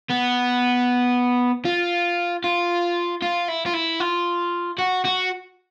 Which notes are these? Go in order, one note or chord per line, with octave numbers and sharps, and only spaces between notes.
B3
F4
F4
F4
E4
F4
E4
F4
F#4
F#4